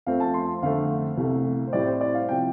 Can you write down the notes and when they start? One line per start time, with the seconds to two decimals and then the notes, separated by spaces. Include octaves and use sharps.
0.06 F2 F3 A3 C4 F5
0.20 A5
0.34 C6
0.62 F2 D3 A3 C4 F5
1.17 C2 C3 A3
1.67 C5
1.73 A2 G3 C4 D5
1.87 C5
2.01 D5
2.14 F5
2.29 C3 F3 G5